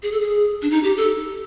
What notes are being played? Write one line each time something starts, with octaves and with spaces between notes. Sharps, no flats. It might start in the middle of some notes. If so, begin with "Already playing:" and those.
G#4
A4
G#4
D4
D#4
G4
A4